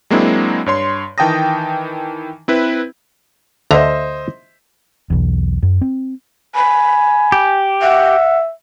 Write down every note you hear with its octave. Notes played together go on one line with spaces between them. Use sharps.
F#3 G#3 A#3 C4 D4 E4
G2 C#5 C6
D#3 E3 G5 A5 D#6 A#6
C4 E4 B4
D2 D3 C5 D#5 E5 A#5
B1 E2
F#2
C4
G#5 B5
G4
E5 F#5